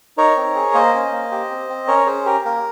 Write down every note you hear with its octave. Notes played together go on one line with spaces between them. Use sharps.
D#4 A#4 C#5
C4
G#4
A#3 C5 D#5
C#4
A#3
G4
C4
C4
C#4 A#4 C#5
C#4 G#4 C5
G4 A#4
A#3 A#4